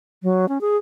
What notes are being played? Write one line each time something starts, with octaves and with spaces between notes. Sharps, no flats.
F#3
C#4
G#4